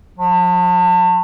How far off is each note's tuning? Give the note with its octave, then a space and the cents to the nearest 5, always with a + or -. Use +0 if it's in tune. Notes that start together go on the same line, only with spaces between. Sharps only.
F3 +45